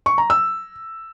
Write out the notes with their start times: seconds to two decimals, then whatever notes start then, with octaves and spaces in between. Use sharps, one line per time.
0.06 C#6
0.18 A#5
0.30 E6